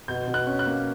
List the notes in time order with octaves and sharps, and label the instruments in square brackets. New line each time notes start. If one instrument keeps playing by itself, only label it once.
[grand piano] B2 G6
B2
F#6
C#4
F#6
A#3